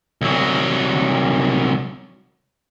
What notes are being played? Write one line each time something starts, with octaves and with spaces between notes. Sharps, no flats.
C2 F#3